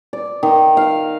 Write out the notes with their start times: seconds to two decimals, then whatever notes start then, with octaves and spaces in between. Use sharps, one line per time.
0.13 D5
0.43 D#3
0.77 F5